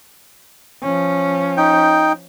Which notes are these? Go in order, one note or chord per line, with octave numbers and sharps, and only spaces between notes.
F3 C#4
D#4 G5